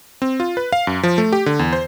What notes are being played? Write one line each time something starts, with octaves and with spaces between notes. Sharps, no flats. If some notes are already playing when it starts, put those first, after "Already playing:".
C4
F4
B4
F5
F#2
F3
A3
G4
D3
E2
C5